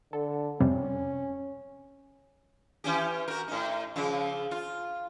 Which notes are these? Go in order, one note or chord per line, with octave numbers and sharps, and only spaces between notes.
D3 A4
F2 C3 G3 C#4
E3 C#4 G4
F#4 A#4
A2 D#4
C#3 F3
F4